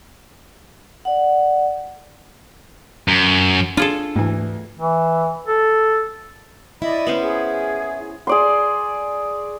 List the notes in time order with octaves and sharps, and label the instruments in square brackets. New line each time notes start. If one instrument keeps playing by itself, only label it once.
[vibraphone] D5 F#5
[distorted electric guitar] F#2
[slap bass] D4 [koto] F4 G#4 A4
[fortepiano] D2 E3 [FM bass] G#2
[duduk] E3
A4
[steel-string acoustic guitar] E4 [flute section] D5 D#5 B5
[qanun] B3 C#4 C5
[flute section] G#4
[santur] G#4 D5 C6